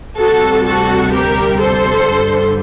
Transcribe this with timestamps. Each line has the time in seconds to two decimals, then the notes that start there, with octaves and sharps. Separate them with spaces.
0.17 D2 C3 G3 F#4 A4
0.65 F#4 A4
1.12 G4 A#4
1.60 A4 C5
2.07 G2 D3 G3